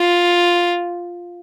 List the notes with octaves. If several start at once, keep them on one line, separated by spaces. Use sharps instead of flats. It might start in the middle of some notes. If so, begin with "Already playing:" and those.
Already playing: F4